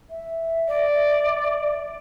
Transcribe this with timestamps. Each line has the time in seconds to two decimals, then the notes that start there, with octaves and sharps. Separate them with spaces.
0.10 E5
0.68 D5